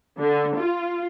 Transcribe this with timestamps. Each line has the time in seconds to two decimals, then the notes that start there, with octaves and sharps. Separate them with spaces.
0.18 D3
0.56 F4